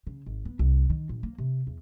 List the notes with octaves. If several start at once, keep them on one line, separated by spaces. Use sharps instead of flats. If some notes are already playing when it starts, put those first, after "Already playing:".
C#3
G#1
B3
C2
D#3
A#1
A#3
C3
E2